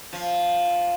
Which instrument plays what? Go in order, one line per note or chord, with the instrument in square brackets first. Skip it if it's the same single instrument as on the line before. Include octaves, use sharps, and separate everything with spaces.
[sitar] F3